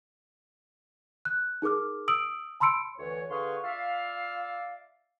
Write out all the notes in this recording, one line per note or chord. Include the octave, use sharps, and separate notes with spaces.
F#6
D#4 G#4 A#4 D6 F6
D#6 E6 D7 F#7
A5 B5 C6 E6 C#7 D7
D2 E3 B4 C#5
D3 G#4 B4 F5 C6 C#6
F4 D5 E5 F5